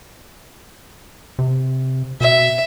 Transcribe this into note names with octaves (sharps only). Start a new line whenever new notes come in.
C3
B2 E5